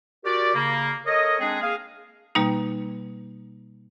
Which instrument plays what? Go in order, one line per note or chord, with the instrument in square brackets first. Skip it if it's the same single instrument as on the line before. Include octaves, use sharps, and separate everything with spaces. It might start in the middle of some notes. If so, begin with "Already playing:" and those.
[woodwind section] F#4 G4 A#4 D5
C#3 A#3
A4 A#4 C#5 D#5
G#3 C4 D4 D#4 G#4
A#3 G#4 F5
[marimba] B2 G3 A#3 D#4